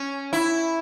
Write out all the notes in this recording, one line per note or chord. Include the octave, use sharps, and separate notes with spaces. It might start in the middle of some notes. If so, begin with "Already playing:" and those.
Already playing: C#4
E4